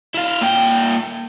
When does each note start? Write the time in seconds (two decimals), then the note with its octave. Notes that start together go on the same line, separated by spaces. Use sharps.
0.14 E4 F5
0.41 A#2 G5